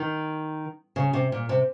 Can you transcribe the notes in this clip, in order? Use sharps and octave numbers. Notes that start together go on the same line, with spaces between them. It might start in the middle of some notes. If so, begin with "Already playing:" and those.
Already playing: D#3
C#3
C3
A#2
C3